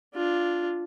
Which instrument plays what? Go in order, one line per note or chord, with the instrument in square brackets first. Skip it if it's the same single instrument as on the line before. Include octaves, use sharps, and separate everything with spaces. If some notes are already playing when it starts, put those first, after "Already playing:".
[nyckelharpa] D4 F4